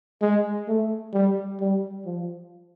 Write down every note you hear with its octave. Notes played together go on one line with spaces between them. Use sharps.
G#3
A3
G3
G3
F3